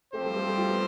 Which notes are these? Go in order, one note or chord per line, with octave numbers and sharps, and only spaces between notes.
F3 A3 C4 G4 C5
G3
A3
G3
F4
B3